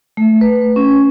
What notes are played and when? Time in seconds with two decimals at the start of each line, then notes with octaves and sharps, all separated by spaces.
0.17 A3
0.41 B4
0.76 C#4